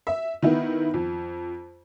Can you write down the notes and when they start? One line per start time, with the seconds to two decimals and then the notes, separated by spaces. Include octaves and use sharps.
0.07 E5
0.42 D#3 B3 E4
0.94 F2